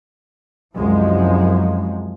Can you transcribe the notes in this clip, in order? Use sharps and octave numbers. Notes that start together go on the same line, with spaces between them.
C2 F#2 F3 G#3